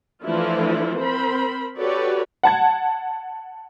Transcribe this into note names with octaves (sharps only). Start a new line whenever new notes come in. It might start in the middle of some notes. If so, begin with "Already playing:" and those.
E3 F3 A3 D4 E4 F4
C4 A#4 C5 B5
F#4 G4 A4 B4 C#5 D5
F#5 A5 G#6